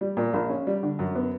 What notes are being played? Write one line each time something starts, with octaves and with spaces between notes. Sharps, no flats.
G3
A#2
A#1
C#4
G3
D3
F#2
B3